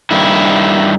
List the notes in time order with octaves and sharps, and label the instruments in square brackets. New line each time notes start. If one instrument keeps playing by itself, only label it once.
[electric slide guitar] G2 D#3 E4